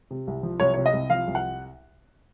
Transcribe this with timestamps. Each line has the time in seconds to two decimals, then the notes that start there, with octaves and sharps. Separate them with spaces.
0.11 C3
0.27 C2
0.43 F3
0.60 C2 C#5
0.74 C3 C#5
0.86 D#5
0.93 C2
1.10 F3 F5
1.27 C2
1.35 F#5